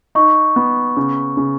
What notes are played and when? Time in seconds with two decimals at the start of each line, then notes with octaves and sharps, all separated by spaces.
0.15 D#4 C#6
0.56 B3
0.97 C#3
1.37 C#3